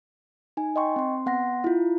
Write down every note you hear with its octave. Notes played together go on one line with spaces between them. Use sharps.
D#4 G#5
D#5 G5 C6 C#6
C4 C6
B3 F#5 C6 A#6
E4 F4